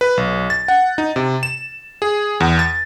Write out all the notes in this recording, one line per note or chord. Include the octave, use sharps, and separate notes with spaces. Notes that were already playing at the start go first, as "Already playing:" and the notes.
B4
B1
A6
F#5
D#4
C3
E7
G#4
E2
A6